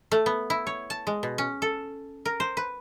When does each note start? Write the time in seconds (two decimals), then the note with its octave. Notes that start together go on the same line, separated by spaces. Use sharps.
0.12 A3
0.26 B3
0.50 E4
0.67 C#5
0.90 A5
1.07 G#3
1.23 B2
1.38 C#4
1.62 A4
2.25 A#4
2.40 C5
2.57 B4